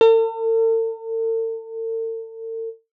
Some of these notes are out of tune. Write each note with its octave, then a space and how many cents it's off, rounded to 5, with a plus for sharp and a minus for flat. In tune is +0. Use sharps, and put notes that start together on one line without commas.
A4 +45